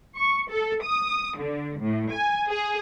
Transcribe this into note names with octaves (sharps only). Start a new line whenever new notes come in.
C#6
A4
D#6
D3
A2
G#5
G#4